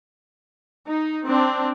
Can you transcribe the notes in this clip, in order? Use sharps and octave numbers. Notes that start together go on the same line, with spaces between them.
D#4
C4 D4